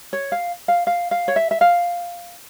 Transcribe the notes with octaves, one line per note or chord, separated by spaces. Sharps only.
C#5
F5
F5
F5
F5
C#5
E5
E5
F5